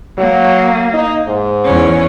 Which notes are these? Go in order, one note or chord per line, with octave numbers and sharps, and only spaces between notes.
F#3 A#3
D#4
G#2
E2 C#4